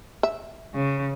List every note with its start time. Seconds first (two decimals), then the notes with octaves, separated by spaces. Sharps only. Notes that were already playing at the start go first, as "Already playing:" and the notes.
0.23 E5
0.74 C#3